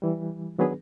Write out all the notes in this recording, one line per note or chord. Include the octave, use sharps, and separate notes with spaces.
E3 G3
D#3 F#3 B3 D4 G#4 B4